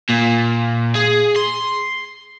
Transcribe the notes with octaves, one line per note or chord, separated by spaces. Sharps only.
A#2
G#4
C6